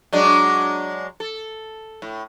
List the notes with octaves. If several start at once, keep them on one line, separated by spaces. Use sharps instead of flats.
F#3 G#3 D4
A4
A2